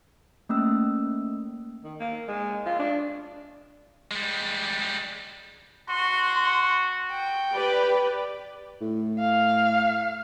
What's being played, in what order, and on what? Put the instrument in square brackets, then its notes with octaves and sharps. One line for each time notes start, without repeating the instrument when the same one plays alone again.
[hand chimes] A3 A#3 C#4 E6
[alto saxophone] D#3
A#3
G#3
F4
D4
[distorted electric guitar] G3 G#3
[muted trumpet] F#4 [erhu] C6
[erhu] G5
[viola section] G4 B4 D5
[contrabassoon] A2
[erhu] F5